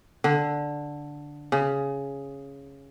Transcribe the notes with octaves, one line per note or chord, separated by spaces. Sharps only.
D3
C#3